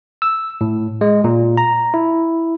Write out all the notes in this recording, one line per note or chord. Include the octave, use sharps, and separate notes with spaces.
E6
A2
G#3
A#2
A#5
E4